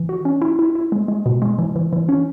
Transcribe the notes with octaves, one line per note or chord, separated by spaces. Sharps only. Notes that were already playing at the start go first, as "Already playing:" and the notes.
Already playing: E3
F#4
C#4
E4
E4
E4
G#3
G#3
B2
G#3
E3
E3
E3
C#4